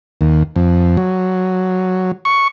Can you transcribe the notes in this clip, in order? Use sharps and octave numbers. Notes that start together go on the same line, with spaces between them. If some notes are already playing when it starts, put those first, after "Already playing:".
D#2
F2
F#3
C#6